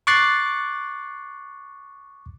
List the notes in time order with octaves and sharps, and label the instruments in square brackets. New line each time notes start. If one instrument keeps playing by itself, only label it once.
[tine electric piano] C#6 D6 F#6 A6 C7